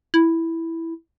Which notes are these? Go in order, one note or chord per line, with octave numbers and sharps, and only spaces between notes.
E4